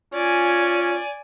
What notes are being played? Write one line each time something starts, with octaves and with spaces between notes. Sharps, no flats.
C#4 F4 D5 G#5